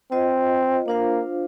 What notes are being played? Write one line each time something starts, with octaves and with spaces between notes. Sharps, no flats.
C4 F4 C5 D#5
A#3 D4 F4 C5 F5